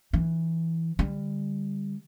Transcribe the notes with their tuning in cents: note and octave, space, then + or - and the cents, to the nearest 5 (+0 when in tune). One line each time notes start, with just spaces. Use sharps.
E3 -5 D4 +45
D3 +0 G3 +20